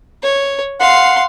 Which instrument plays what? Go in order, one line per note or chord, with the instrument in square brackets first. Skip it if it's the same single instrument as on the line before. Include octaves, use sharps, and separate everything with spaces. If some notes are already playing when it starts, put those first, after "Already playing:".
[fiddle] C#5
[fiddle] F5 C6 [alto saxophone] F#5